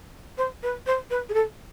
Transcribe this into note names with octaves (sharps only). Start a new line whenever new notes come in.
C5
B4
C5
B4
G#4
A4